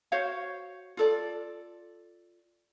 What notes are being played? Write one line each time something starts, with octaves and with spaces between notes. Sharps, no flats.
F#4 C5 C#5 F5
F4 A4 D5